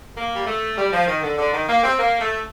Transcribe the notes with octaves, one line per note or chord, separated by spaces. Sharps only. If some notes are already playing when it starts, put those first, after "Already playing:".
A#3
G3
A3
G3
F3
D#3
D3
D3
D#3
A#3
C4
A#3
A3